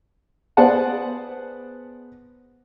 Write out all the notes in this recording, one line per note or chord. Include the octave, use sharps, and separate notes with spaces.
B3 G#4 C5 D5 F#5 A5